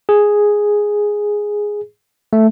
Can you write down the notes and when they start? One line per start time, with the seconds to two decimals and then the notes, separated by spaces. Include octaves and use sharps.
0.09 G#4
2.33 A3